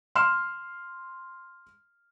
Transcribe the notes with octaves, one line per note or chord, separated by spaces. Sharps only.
C6 F6 E7